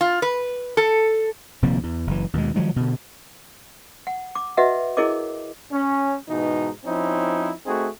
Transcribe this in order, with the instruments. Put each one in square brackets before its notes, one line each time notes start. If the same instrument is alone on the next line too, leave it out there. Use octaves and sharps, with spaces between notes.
[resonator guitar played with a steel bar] F4
B4
A4
[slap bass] D#1 C3 F3 A#3
E2
F#1 E3
D#2 B2 G#3
D#3 F3 F#3 G#3
B2 D3
[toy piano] F#5
D6
F#4 B4 D#5 E5 F#5
E4 G#4 A#4 C#5 D#5 D6
[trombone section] C#4
G#2 B2 E3 D#4
F3 C4 C#4 D#4 E4
A3 C4 D#4 F#4 G#4